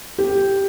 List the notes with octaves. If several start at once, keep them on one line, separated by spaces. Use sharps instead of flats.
G4